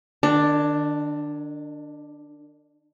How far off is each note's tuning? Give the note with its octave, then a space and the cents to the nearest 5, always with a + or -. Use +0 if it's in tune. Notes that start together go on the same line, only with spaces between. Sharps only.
D#3 -40 D4 +5